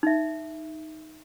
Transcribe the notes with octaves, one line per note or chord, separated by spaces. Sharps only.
D#4 E5